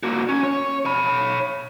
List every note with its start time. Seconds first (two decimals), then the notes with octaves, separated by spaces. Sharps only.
0.03 A#3 F#4
0.29 C#4
0.43 C#5
0.85 C#5 B5